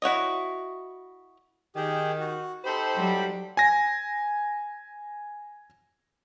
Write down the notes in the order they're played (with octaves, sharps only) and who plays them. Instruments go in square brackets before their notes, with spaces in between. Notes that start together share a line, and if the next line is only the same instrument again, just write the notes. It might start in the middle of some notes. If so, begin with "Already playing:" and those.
[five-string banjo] E4 F#4 C#5 D#5
[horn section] D#3 [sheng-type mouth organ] G4 G#4
[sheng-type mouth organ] F#4
[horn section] D#4 A4 C5 [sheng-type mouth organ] G4 B5
[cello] F#3 G3
[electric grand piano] G#5 A#6